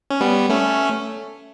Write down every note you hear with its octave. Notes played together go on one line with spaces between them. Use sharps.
C#4
G3 B3
A3 C#4